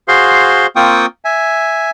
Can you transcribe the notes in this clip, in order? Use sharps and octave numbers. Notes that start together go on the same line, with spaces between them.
F#4 G#4 C5 F5 C6
A#3 C4 F4 G5 C#6 D#6
E5 G#5